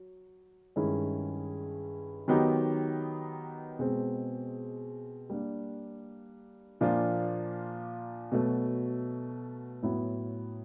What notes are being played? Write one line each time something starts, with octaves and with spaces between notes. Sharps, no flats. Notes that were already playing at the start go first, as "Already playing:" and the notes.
Already playing: F#3
G2 D#3 G#3 C#4 E4
D#3 F#3 B3 D#4 G4
B2 G#3 C4
G3 A#3 D4
A#2 F3 A#3 D4 F4
B2 F#3 A3
A2 F#3 B3 E4